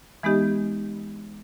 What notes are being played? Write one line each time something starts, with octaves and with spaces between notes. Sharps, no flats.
E3 G#3 B3 D#4 G4 D#5